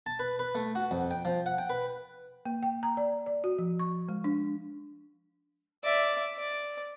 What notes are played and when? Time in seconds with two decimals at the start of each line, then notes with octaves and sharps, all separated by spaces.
0.06 A5
0.19 B4
0.39 B4
0.55 A3
0.75 F#4
0.91 F2
1.11 G5
1.25 F3
1.46 F#5
1.58 G5
1.70 B4
2.46 A#3
2.63 G5
2.83 A#5
2.97 D5
3.26 D5
3.44 F#4
3.59 F3
3.80 C#6
4.09 G#3
4.24 D4
5.84 D5 E5
6.37 D5